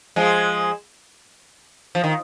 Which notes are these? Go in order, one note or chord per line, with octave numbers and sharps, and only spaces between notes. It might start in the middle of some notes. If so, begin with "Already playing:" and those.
F3 G#3
F3
D#3